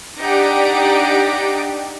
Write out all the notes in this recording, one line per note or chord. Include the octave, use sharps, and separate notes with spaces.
D4 D#4 G4 D5 F#5 D7